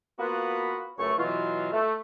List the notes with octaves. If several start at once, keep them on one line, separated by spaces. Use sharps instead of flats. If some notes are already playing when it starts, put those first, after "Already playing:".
A#3 B3 F4 F#4 B4
C#2 F#2 A3 C#5 C#6
B2 E3 F#3 F4
A3